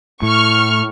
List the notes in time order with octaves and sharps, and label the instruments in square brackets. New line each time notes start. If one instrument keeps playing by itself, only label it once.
[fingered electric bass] A2 [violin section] C#6 F6